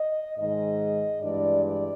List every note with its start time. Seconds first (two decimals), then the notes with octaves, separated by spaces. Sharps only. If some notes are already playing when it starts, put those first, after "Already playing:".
Already playing: D#5
0.38 G#2 D#3 G#3 D#5
1.21 G2 E3 G#3 D5
1.64 D5